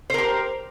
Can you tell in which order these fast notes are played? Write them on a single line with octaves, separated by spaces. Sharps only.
C5 A#4 G4